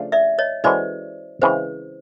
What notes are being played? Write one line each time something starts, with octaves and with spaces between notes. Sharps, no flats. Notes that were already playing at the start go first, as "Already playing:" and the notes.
Already playing: C#3 F3 A3 D4 F4
D5 E5
C#5 D#5
E3 G#3 C#4 F#4 A4 C5 D5
C#3 E3 G#3 C4 C5